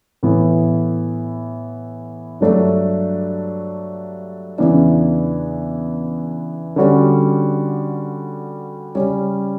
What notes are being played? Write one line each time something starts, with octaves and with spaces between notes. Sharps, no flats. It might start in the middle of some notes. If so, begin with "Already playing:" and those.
A2 E3 B3
G2 F#3 A3 D4
E2 C#3 E3 B3 D4
D3 G3 C#4 F#4
C#3 G3 C#4